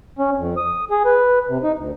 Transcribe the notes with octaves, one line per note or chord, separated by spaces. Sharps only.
C#4
F2
D#6
G#4
B4
C3
D#4
D2